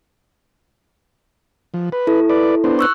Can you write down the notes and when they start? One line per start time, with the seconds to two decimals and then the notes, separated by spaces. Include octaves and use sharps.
1.74 F3
1.92 B4
2.07 E4 A4
2.30 B4 D5
2.64 B3 D4 C5
2.79 C#6 E6 F#6